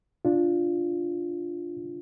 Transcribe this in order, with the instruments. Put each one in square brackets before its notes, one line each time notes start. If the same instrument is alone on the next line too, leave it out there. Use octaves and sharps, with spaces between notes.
[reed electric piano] D4 F4